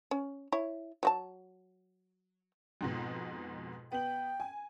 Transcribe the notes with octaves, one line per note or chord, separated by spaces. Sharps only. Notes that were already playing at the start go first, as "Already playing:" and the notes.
C#4
E4 C#5
F#3 F#4 A5
F2 G#2 B2
B3 G5 F#7
G#5